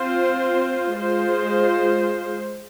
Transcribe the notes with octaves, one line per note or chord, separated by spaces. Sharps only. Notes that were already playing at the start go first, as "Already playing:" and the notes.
Already playing: C4 F4 C5
G#3 F4 C5